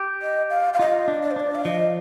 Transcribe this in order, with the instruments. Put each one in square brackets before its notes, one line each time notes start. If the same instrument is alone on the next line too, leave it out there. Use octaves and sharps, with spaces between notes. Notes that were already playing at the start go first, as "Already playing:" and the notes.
Already playing: [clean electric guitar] G4
[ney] D#5
F5
F5
[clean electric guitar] F4 [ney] D#5
[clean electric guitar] D4
[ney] D5
C5
[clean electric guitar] D4 [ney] D5
[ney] F5
[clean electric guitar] F3 [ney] D#5